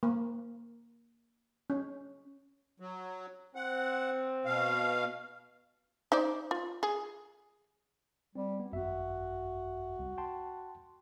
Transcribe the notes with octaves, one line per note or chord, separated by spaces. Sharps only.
A#3
C#4
F#3
C4 F#5
B2 F5
D#4 C5 D5
F4
G#4
G3 C4
B3
G#1 F#2 F#4 E5
C2
G5 A5 C6